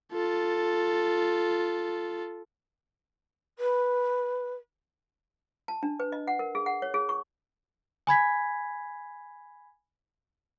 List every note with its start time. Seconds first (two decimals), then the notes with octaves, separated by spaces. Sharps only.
0.13 F4 A4
3.57 B4
5.68 A5
5.83 D4
6.00 B4
6.12 D#5
6.28 F#5
6.39 A#4
6.55 G#4
6.66 F#5
6.82 C#5
6.94 G#4
7.09 C#6
8.07 G#5 B5 G#6 B6